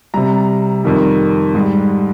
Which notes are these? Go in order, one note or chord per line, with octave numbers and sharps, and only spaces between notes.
C3 G3 A#5
F2 D#3 G3
G#2 G3